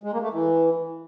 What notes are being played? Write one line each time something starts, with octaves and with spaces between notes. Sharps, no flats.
G#3
A#3
A3
E3